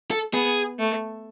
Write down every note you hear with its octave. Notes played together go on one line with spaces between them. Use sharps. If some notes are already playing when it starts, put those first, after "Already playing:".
A4
B3 G#4
A3